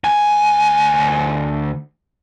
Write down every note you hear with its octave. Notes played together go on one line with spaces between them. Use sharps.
D2 G#5